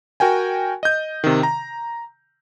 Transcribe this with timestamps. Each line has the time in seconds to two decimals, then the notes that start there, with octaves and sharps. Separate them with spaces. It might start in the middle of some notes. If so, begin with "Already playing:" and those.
0.20 F#4 A#4 G5 G#5
0.83 D#5 G6
1.24 C3 D#3
1.43 A#5